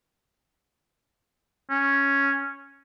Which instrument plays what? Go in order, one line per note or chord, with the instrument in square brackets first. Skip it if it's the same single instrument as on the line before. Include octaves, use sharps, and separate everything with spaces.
[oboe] C#4